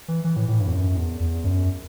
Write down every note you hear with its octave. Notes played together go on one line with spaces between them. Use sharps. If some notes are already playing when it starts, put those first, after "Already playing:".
E3
E3
A2
A2
G2
E2
F#2
E2
E2
F#2